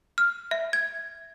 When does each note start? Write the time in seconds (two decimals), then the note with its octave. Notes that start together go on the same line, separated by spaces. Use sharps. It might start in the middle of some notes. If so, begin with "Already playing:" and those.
0.18 F6
0.51 E5
0.73 G#6